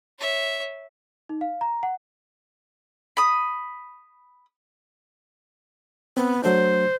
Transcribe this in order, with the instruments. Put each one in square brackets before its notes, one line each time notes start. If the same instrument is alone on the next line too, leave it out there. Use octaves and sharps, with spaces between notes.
[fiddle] C#5 E5
[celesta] D#4
F5
A#5
F#5
[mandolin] B5 D#6
[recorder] B3 [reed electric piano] C4
[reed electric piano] F#3 A3 D4 [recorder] C5